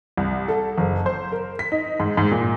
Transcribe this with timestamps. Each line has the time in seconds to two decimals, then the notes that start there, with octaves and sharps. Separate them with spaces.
0.17 C2
0.48 A4
0.78 F#1
1.06 C5
1.32 A#4
1.59 B6
1.72 D#4
2.00 G#2
2.17 G#2
2.31 A#2